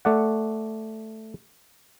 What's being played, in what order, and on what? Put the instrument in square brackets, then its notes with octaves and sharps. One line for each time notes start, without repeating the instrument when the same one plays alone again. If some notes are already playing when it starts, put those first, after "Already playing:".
[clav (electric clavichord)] A3 D5 F#5